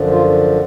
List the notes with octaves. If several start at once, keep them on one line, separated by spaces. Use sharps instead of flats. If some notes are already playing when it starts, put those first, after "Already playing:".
Already playing: F#2 D3 F3
F4